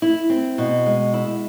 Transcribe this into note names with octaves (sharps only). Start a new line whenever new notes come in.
E4
C4
B2
G#3
E4